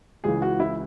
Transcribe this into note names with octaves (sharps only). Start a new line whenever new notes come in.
C#2 C#3 E3 G#4
F#4
E4